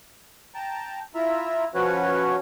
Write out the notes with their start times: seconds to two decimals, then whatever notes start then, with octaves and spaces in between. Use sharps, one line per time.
0.55 G5 A5 A#5
1.15 E4 F4 E5 A#5
1.75 F3 C#4 F#4 B4 C#5